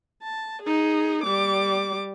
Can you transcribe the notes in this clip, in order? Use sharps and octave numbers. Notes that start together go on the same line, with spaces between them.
A5
D#4 G#4
G3 D6